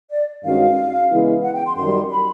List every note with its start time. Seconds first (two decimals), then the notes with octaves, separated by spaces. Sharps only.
0.10 D5
0.43 G2 D#3 G#3 C#4 F#4 F5
1.10 C#3 E3 G#3 B3 E4
1.43 F#5
1.54 G5
1.66 C6
1.76 F#2 D#3 G3 C6
2.10 B5